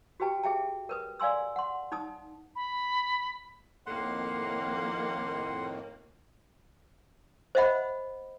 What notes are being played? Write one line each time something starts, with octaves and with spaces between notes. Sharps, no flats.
F#4 G4 B4 G5 A5
G#4 E5 G5 A5
A#4 B4 D#6
D5 F5 G#5 C6 E6
F#5 C6
D#4 A5 D#6
B5
F2 A2 D#3 A#3 F#5 C6
C5 D#5 E5 F#5 B5